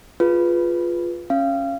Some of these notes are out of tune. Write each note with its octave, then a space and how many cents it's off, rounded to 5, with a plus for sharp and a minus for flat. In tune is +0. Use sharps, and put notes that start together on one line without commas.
F4 +0 G#4 +0 B4 +0
C#4 -10 F5 -25